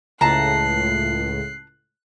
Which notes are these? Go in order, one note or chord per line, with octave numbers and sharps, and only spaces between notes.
C#2 A2 A5 A#5 F#6 C7